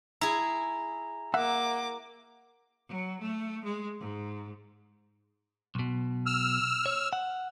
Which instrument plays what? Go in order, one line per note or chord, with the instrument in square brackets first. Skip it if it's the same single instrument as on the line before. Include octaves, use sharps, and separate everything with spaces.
[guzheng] E4 G#4 [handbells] A#5
[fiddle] A#3 D6 [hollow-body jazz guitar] E5 F#5
[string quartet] F#3
A3
G#3
G#2
[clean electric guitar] B1 B2
[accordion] E6 F6
[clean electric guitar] C#5
F#5